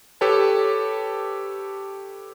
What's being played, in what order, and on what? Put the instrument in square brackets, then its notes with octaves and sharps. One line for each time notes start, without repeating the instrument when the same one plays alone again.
[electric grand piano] G4 A4 B4 C#5 A5